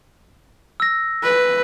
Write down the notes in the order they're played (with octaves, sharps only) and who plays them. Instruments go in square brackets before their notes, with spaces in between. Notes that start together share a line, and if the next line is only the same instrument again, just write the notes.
[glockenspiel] E6 A#6
[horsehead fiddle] B4